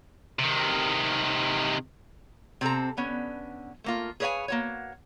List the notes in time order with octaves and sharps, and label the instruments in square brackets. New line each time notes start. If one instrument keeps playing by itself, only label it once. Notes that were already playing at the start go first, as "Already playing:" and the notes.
[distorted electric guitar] C3 D#3
[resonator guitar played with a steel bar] C3 C4 A4 A#5
D3 B3 C#4
A3 A#3 F4
G#4 B4 C#5 D#5 F5 G#5
A#3 F#4 C#5